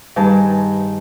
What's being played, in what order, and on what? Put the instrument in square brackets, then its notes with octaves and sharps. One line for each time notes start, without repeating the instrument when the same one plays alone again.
[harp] G2 D#3 D#4 G#4 A5